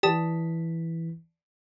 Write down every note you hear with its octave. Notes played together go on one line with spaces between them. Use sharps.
E3 G4 D5 A5 D#6 B6